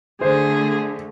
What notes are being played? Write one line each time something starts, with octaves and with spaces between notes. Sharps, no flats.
D3 A3 G#4 C5